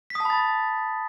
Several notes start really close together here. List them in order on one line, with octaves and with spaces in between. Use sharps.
B6 D#6 A5 B5 A6